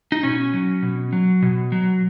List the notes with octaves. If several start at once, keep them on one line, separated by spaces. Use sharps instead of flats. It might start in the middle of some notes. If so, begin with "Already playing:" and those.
D#4
B2 C#4
F#3
B2
F#3
B2
F#3